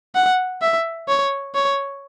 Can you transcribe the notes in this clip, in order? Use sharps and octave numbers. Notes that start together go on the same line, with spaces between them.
F#5
E5
C#5
C#5